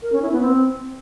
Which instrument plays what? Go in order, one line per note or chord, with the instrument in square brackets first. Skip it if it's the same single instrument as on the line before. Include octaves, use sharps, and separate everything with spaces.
[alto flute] A#4
C#4
E4
B3
C4